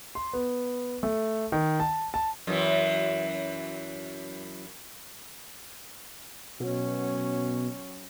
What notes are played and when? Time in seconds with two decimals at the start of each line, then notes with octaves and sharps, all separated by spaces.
0.15 C6
0.33 B3
1.03 A3
1.52 D#3
1.80 A5
2.14 A5
2.47 F#2 E3
6.60 B2 F#3 C#4